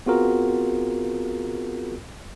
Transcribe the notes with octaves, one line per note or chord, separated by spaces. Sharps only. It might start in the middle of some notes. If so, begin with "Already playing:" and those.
B3 C4 F4 F#4 G#4 A#4